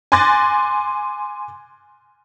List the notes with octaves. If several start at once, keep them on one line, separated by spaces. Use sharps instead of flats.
G#5 C6 D6 F#6 A6 A#6